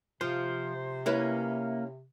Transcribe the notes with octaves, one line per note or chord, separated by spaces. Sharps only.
C3 F3 C5
A#3 C#4 E4 B4